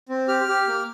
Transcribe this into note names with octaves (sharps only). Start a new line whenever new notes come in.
C4
G4 F6
G4
A#3